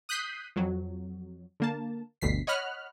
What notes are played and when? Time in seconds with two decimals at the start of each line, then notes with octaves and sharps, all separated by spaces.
0.09 D#6 F#6 G6 B6 C7 D#7
0.56 F2 F#3
1.60 D3 A#3 A5
2.22 G1 D2 B2 B6 C7
2.47 C#5 D#5 F#5 B5 F6 F#6